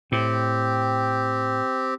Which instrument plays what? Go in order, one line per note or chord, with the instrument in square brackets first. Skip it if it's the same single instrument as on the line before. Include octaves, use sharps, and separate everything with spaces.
[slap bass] A2 [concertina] C4 G4